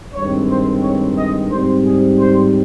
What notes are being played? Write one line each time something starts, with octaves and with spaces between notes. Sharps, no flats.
G2 D#3 G#3 C4 C#5
C5
C#5
D#5
G#2 G3 C4 C5
G#4
C5